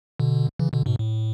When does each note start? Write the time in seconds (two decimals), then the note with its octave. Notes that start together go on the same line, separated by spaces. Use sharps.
0.20 B2 D3
0.59 C#3 E3
0.73 B2 D3
0.86 G#2 B2
0.99 A2